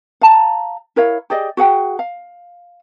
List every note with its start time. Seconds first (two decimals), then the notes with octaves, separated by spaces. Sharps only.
0.21 F5 A5 A#5
0.96 E4 A#4 C#5 F5
1.30 G4 G#4 D5 D#5
1.57 F#4 G#4 F#5 G5
1.99 F5